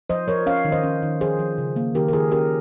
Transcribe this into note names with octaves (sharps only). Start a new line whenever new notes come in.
F3 C5 D#5
F3 A#4 C#5
C#4 C#5 F5
D#3
C5 D#5
C#4
D#3
F3 G#4 C5
F3
C#3
A#3
D#3 G4 A#4
A#4
D#3 F4 G#4
C#4 G4 A#4